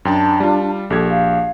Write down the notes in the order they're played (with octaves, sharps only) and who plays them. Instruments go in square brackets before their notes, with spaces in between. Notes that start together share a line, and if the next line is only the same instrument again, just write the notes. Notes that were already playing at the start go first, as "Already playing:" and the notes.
[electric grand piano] F#2 G5 A5 [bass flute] D4
[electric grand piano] G3 F4
[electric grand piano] A#1 G4 G#6 [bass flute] A4
[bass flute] F5